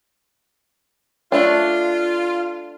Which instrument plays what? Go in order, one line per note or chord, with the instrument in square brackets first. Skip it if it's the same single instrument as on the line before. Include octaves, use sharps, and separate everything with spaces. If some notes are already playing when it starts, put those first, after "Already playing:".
[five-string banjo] A3 D4 [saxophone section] F4